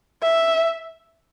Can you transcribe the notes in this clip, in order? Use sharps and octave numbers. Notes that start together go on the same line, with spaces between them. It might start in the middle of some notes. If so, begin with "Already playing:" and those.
E5